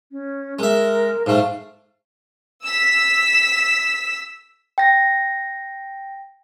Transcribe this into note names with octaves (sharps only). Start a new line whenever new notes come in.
C#4
G#3 A#4 E5
G#2 A3 F5
E6 B6
G5 A#6